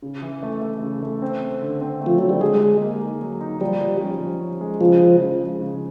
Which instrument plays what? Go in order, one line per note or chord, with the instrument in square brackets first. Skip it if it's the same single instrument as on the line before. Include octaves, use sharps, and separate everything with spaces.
[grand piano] C#3
E3
A3
A3
C#3
A3
C4
C4
D3
C4
A3
[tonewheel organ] F3
[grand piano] D3 [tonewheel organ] F#3
[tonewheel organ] G3
[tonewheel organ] G#3 [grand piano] G#4
[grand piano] G#4
A#3
D#4
F#3
D#4
[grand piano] F3 [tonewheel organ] G3
[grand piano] F3
C#4
F3
C#4
G#3
[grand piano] C#3 [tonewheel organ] F3
[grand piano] C#3
F3
G#3
C#3